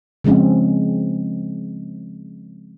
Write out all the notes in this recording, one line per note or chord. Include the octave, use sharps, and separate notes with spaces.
C#3 F3 G#3 C4 C#4